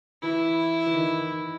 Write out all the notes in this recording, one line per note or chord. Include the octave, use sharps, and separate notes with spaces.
E3 E4
E3
D#3